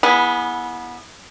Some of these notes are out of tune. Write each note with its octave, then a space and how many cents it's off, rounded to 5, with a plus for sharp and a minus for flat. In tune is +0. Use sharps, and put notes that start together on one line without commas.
B3 -25 E4 -5 G#4 +0